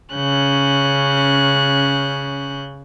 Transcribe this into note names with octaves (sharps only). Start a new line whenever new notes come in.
C#3 C#4 F#6 G6